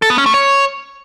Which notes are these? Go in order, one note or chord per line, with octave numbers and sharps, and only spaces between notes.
A4
B3
C#4
A3
C#5